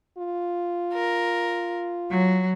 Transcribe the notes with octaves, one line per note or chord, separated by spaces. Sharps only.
F4
A#4
F#3